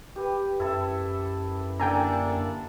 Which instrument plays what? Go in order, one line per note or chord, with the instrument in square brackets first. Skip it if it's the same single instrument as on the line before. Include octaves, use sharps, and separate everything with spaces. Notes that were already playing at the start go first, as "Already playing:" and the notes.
[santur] G4 B4
[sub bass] F#2 [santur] E4 A4 E5
[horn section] D3 A#3 D4 [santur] A4 [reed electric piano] G5 G#5 A#5